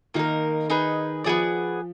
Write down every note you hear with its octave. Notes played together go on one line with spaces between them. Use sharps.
D#3 A#3 D#4 A#4
D#4 G#4 B4
F3 B3 D#4 G#4 D5